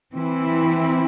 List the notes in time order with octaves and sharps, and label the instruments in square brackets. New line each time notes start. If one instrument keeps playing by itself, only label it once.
[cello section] E3 C4 E4